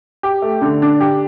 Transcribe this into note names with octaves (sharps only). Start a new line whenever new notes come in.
G4
A3
D3
D4
G4